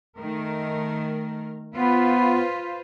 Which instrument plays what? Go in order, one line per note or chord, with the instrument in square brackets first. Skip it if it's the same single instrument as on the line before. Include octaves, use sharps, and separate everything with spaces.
[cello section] D#3 A3 A#4
[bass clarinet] B3 [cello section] F4 B4 C5